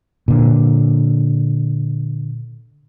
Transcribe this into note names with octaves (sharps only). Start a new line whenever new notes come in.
A#2 D3